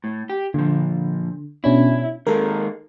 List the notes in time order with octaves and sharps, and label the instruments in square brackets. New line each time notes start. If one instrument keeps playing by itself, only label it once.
[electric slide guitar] A2
G4
[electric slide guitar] A#2 F3 [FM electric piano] D3
[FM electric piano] B2 C#4 D4 [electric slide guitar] E4
[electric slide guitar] D#3 G#3 A#3 [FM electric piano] A4 A#4